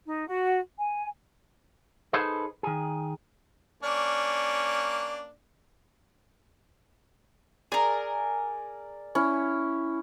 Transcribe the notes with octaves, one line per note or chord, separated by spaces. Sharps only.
D#4
F#4
G#5
D#4 G#4 A4 B4 C5 D#5
D#3 G#4
A#3 C#4 D4
G#4 A#4 D5
C#4 E4